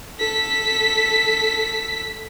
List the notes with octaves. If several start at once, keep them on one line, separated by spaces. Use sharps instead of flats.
A4 B6